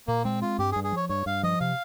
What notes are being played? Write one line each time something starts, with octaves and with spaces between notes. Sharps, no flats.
A#2 A#3
G#3 C4
C4 F4
G2 G4
G#4
G2
G#4
F3 C#5
G2 C#5
G2 F5
F3 D#5
C3 F5